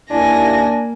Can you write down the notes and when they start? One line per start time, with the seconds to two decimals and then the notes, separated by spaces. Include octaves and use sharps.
0.11 D#2 A#3 D4 E4 G#5 A#6